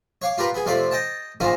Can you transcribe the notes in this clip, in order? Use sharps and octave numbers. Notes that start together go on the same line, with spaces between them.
C#5 F5 D6
F4 G4 A#4 B4
B3 G#4
F2 C3 A3 F4 D5
D#5 G5 A5
A#1 G#2 D#3 F3 D#4 F4